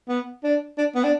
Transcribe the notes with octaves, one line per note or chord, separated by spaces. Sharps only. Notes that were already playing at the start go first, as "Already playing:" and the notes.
B3
D4
D4
B3
D4